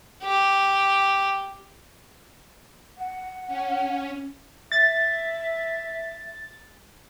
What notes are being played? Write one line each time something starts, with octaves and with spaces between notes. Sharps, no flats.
G4
F#5
C#4
E5 A6